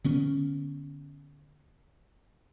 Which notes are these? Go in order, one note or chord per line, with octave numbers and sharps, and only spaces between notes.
D3 B3 C#4